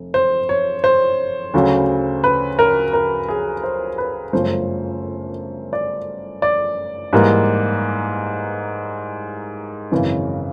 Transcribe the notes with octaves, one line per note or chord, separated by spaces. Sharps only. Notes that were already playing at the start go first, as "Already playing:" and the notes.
Already playing: F1
C5
C#5
C5
D2 C#3 F#3
B4
A#4
A#4
G#4
C5
B4
G1 F#2 C#3 F3 A3 C5
D5
D5
G#2 E3 G3 A#3
G#1 F#2 C#3 E3